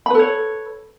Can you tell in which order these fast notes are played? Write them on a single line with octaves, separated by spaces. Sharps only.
B5 B4 A4 C#5